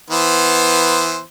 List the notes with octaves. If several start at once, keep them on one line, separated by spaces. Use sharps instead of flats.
E3 B3 C5